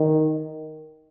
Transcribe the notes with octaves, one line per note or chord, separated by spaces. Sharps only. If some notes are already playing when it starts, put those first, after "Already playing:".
Already playing: D#3